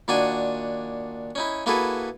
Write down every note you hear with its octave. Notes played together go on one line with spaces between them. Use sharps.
A#2 D#3 D4 F#4 F#5 G#5
C#4 D#4 E4
A#3 E4 F#4 G#4 A4 B4